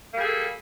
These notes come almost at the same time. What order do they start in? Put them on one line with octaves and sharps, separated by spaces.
A#3 G3 G#4 A4